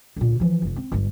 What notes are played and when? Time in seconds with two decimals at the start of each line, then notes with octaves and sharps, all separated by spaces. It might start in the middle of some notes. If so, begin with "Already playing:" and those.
0.16 D2 A#2
0.40 E3 F3
0.62 F1 F2
0.76 C4
0.92 G1 G2